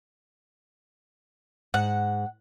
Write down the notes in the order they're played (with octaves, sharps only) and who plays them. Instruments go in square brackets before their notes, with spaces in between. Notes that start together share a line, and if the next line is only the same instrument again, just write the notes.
[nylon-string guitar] G#2 [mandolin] F#5